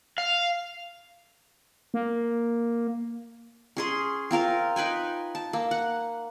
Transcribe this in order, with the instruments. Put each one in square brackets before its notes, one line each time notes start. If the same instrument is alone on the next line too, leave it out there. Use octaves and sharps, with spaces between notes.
[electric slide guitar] F5
[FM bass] A#3
[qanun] C#4 G#4 C6
C4 F4 A#4 F5
D#4 B4 G5 G#5
A5
A#3
F#5